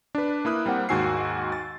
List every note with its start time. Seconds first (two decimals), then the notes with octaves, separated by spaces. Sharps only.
0.15 D4 B4
0.45 A#3 E4 D#6 F#6
0.66 G3 A#3 C4 F#5
0.89 D#2 G#2 F#4 G#5 E6 C7
1.52 A6